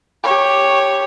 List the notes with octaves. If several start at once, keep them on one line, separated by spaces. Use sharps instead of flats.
G4 C#5